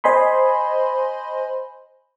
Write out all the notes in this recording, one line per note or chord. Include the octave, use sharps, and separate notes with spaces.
C5 D#5 G#5 B5 C6